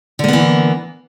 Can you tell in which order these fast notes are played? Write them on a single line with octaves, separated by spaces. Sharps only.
D3 A#3 B3 E3